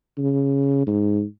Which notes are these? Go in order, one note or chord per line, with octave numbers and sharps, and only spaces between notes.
C#3
G#2